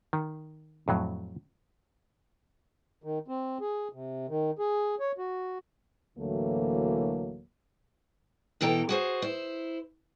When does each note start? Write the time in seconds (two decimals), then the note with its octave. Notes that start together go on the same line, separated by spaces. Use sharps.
0.13 D#3
0.88 F2 A2 F#3
3.04 D#3
3.28 C4
3.61 G#4
3.93 C3
4.29 D#3
4.59 G#4
5.00 C#5
5.18 F#4
6.17 D2 A2 E3 F#3 A3 A#3
8.61 B2 E3 A4 G5 A#5
8.89 F#4 G#4 C5
9.22 E4 C5